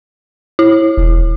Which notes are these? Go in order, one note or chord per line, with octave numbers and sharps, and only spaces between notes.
E4
E1